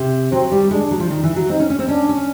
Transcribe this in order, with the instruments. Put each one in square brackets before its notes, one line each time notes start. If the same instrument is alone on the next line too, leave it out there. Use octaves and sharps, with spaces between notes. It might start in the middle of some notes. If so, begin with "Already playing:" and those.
Already playing: [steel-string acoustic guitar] C3
[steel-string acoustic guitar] F#3 [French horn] C4
[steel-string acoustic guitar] G3
[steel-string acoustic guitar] G#3 [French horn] D4
[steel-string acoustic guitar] F#3
F3
D#3
E3
F#3
[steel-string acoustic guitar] C4 [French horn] D#4
[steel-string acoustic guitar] C#4
C#4
C4
[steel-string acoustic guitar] C#4 [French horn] D4
[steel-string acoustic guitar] C#4